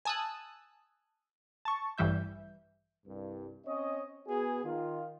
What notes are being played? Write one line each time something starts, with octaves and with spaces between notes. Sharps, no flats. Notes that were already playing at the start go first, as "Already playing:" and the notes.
G#5 A5 D#6 E6 F#6
A5 C#6
A1 G2 E3 G3 E5 G6
C2 G2
C4 C#4 C#5 D#5
B3 F#4 G#4
D#3 F4